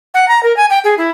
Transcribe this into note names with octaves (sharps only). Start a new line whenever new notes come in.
F#5
A#5
A#4
G#5
G5
G#4
E4